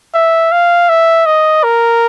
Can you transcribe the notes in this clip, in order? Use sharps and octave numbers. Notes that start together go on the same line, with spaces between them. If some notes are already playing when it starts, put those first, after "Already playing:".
E5
F5
E5
D#5
A#4